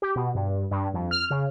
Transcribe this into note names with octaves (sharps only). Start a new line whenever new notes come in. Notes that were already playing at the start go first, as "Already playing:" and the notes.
G4
B2
G2
G2
F2
F6
C#3